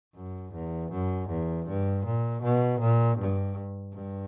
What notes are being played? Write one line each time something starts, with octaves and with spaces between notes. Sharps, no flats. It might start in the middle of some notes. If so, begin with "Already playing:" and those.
F#2
E2
F#2
E2
G2
A#2
B2
A#2
G2
G2